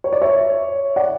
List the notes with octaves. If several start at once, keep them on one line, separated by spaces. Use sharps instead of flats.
C#5
D5
C#5 E5
D5 F#5